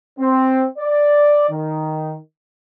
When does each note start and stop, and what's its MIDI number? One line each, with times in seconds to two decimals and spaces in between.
0.19 0.65 60
0.79 1.46 74
1.50 2.16 51